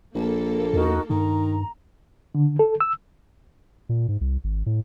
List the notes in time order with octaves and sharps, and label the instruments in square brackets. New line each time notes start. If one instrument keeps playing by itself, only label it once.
[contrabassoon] A#1 [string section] A#3 A4
[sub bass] E2 [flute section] D#4 F#4 A#4
[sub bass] G2 [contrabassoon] D#3 [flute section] A#5
[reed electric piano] D3
A4
E6
[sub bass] A#2
G#2
C2
G#1
A2